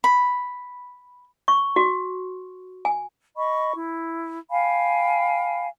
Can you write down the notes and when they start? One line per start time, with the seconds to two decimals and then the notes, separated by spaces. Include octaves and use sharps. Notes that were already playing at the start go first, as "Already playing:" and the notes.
0.04 B5
1.48 C#6
1.76 F#4
2.85 G#5
3.36 D#5 B5 C#6
3.74 E4
4.50 F5 G5 G#5 B5